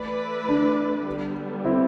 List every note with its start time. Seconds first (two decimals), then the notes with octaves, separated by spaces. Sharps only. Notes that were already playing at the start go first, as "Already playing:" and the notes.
Already playing: E3 A3 E4 B4 D5
0.49 D4
1.06 D3 G3 B3
1.65 C4 E4